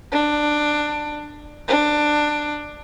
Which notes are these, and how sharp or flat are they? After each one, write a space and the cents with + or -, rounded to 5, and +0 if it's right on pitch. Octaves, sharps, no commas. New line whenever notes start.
D4 +15
D4 +15